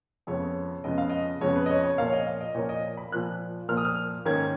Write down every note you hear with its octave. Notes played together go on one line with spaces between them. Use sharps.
F2 C#3 G#3 B3 C#5
F2 C#3 G#3 B3 D#5
F5
D#5
F2 C#3 G#3 B3 C#5
B4
D#5
C#5
C#5
A#2 F3 A#3 F5
C#5
D#5
F5
D#5
A#2 F3 A#3 C#5
D#5
B5
A#2 F3 A#3 F#6
A#2 F3 A#3 F6
D#6
F6
G#2 D#3 A#3 C#4 G#6